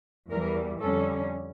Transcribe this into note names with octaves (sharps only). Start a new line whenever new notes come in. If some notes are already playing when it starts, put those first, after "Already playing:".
E2 E3 G3 A#4
F2 D3 G3 C#4 A4